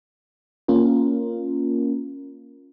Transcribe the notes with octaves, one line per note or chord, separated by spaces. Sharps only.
A#3 C#4 F4 A#4